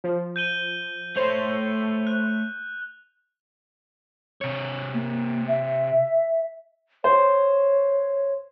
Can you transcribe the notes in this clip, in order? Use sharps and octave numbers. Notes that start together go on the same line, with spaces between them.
F3
G6 D#7 G7
A3 C5 C#5 F7
F#6
C3 C#5
A#3
E5
C5 C#5